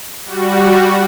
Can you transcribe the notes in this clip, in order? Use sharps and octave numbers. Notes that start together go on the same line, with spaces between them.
G3 F#4